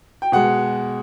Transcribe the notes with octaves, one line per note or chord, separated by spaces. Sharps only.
G5
B2 G#3 F#5